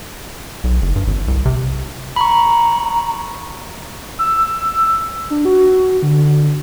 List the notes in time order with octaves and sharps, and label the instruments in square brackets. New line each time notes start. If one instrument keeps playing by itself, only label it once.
[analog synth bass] B1
F#1
G2
G#1
C2
C3
[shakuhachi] A#5 [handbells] B5 C#6
[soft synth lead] E6
D4
F#4
D3